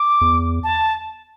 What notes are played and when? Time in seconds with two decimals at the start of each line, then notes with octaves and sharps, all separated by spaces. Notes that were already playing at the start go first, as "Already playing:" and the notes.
Already playing: D6
0.21 E2
0.63 A5